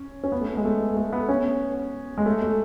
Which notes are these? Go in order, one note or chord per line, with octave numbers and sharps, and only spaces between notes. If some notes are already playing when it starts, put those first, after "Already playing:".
Already playing: C#4
C#4
B3
A3
B3
G#3
A3
A3
B3
C#4
G#3
A3
A3